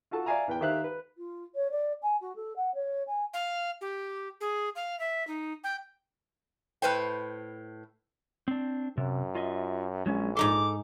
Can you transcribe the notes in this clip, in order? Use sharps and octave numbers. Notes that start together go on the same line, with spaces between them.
F4 F#4 A4 A5
D5 E5 F5 G#5 A#5
E2 B4 G5
D#3 G4 C5 E5 F5 F#6
B4
F4
C#5
D5
G#5
F#4
A4
F#5
C#5
G#5
F5
G4
G#4
F5
E5
D#4
G5
A2 B4 C5 G5
C4 D4
F#2 C3
F4 D#5 E5
A#1 F#3 G#3 C#4
G#2 D#4 A4 C6 D6